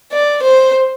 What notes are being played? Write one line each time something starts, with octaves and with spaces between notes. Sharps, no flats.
D5
C5